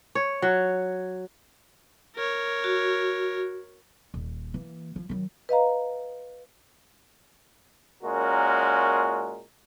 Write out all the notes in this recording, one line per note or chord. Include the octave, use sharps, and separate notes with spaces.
C#5
F#3
A#4 C#5
F#4
D#1
E3 A#3
F3
D#3 F#3
B4 D#5 F5 A#5
A#2 G#3 C#4 F#4 A#4